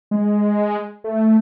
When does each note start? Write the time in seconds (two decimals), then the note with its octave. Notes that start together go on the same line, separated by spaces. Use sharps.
0.11 G#3
1.04 A3